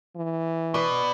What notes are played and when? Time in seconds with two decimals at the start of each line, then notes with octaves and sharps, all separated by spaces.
0.16 E3
0.74 B2 B4 D5